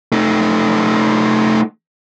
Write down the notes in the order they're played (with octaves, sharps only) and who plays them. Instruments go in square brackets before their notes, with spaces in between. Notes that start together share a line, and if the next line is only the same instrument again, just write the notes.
[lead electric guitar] A3 D#4